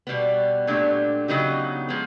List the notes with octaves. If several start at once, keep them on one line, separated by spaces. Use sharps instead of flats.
B2 G3 B3
A#2 F#3 A3 D4 G4
C#3 F#3 B3 D#4 G4
F3 G#3 B3